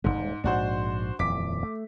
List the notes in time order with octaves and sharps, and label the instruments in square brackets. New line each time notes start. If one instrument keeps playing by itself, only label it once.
[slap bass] D#1 E2 G#3 [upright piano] G#2
[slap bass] A#1 G#2 [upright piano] D4 F#4 C5
[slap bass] D#1 F2 E3 [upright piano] D6 B6
[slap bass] A3